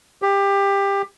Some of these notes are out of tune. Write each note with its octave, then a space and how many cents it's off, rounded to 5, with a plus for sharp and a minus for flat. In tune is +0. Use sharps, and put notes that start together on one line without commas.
G4 +20